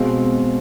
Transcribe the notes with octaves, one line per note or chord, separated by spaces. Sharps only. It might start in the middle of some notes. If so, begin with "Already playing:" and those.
Already playing: B2 G#3 C4 F5